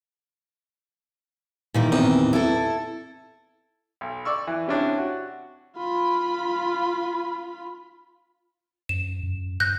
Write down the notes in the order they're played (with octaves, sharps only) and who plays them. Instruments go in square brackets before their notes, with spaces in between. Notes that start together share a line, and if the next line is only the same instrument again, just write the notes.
[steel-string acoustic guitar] A#2 D#3 E3
[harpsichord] E2 C3
[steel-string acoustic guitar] E4 A4
[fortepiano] B1
D5 C#6 E6
E3
C3 C#4 D4 E4
F#4
[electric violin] F4 B5
[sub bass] F#2 [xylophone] E7
[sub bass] F#2
[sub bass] G2 [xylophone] F#6 G6 A#6